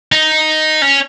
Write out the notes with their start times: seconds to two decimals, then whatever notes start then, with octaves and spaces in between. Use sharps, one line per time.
0.12 D#4
0.82 C#4